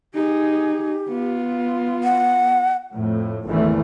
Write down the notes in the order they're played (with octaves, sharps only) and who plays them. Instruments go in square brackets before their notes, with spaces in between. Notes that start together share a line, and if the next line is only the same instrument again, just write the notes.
[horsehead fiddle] D#4 G#4 [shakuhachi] G4
[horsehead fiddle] B3 F4
[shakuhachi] F#5
[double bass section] F2 A2
G#1 E2 D3 E3 A3